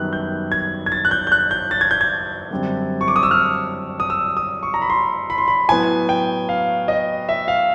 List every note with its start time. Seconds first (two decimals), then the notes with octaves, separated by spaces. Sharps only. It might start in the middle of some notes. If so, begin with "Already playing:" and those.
Already playing: F#2 D#3 G3 B3 F#6
0.13 G6
0.52 G#6
0.86 G#6
0.92 A6
1.05 F#6
1.11 G6
1.27 G6
1.32 F#6
1.51 G6
1.71 A6
1.81 G#6
1.91 G6
2.01 G#6
2.51 F#2 D3 G3 C4
3.01 C#6
3.08 D6
3.16 D#6
3.23 E6
3.31 F6
4.00 D#6
4.10 E6
4.37 D#6
4.63 C#6
4.74 A#5
4.82 B5
4.90 C6
5.30 B5
5.38 C6
5.48 B5
5.69 A2 F#3 B3 G#5
6.09 G5
6.49 F5
6.88 D#5
7.29 E5
7.48 F5